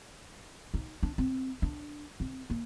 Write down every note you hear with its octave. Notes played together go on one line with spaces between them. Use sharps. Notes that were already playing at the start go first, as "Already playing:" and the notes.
D#4
D4
C4
D4
C4
A#3